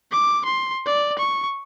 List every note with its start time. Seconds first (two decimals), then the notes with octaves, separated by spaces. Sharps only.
0.11 D6
0.45 C6
0.86 D5
1.18 C#6